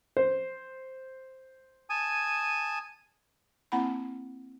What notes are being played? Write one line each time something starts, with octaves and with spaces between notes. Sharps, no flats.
C5
G#5 A5 D#6
A#3 C4 E4 F#5 A#5 B5